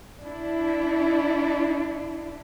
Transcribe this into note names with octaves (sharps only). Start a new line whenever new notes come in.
D4 E4